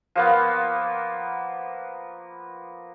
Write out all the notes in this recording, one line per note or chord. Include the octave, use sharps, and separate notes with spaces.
F3 A#3 B3